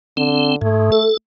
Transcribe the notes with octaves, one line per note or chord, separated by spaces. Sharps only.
D3 C4
G#2 A3
A4